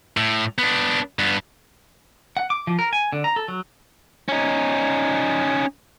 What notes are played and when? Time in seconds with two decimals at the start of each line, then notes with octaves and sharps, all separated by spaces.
0.17 A2
0.58 B3 D4
1.19 G2 B3
2.37 F#5
2.50 D6
2.67 F3
2.79 A#4
2.93 G#5
3.13 D3
3.24 A#5
3.36 A4
3.48 F#3
4.28 C#4 D#4